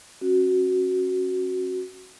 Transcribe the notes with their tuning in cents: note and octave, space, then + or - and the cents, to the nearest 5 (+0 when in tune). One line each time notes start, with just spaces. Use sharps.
C#4 -35 F#4 +0